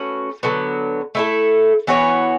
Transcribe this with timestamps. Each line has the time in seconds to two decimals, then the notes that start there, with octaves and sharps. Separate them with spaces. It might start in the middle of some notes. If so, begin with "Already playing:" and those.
Already playing: A3 C#4 F#4 B4
0.43 D3 F#3 B3
1.15 A3 E4 A4
1.87 E3 B3 F#4 C#5